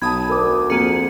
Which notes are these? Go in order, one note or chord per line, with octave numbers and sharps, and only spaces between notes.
B1 A5 B5 D#6 G#6
D2 A#4 D6
F2 A#3 G#4 C#7 D#7